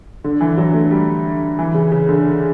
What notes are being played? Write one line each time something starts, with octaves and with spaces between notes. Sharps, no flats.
D3
E3
F#3
A3
G3
E3
C#3
C#3
D3